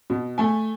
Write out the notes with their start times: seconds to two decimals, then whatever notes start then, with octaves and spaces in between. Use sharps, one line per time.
0.10 B2
0.38 A3 G#5